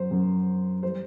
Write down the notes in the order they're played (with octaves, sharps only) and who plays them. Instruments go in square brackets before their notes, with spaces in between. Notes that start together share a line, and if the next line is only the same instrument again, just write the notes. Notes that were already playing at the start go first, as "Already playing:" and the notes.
Already playing: [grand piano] F#2 F#3 C5
F#2 F#3
E3 G3 C5